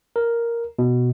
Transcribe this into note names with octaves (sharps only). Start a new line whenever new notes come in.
A#4
B2